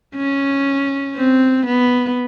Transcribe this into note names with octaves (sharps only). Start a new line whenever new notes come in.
C#4
C4
B3